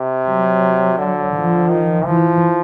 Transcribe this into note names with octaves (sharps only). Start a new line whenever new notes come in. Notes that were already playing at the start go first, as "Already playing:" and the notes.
Already playing: C3
F#3
D3
F3
D#3
E3 F3